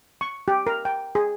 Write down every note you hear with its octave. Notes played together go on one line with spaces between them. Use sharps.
C#6
G4
A#4
G5
G#4